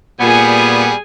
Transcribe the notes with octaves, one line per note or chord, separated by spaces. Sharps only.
A#2 G3 B3 G#4 G#5